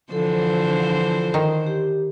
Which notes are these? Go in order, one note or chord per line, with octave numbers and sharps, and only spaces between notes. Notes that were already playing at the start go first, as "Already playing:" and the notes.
D3 E3 F3 A4 C5
D#3
G4